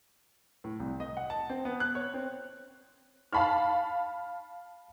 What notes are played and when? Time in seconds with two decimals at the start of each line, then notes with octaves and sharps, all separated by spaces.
0.64 A2
0.80 C2
1.00 D#5
1.17 F#5
1.30 A5
1.49 C4
1.65 B3
1.80 F#6
1.95 C#5
2.14 C4
3.33 F5 A5 B5 C#6 F6